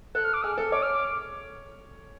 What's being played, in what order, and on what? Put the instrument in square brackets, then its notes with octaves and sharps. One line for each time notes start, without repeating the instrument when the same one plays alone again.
[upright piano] A4 [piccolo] F#6
[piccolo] F6
D6
[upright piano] G#4 [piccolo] F6
[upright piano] A4
[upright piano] C#5 [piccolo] D6
[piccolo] F6
D6